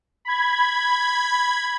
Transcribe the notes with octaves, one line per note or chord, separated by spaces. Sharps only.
B5 G#6